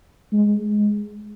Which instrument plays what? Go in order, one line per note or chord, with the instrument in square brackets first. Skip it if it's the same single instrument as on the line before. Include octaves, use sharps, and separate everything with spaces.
[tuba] G#3